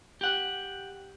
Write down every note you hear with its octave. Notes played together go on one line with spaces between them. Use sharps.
G4 F#5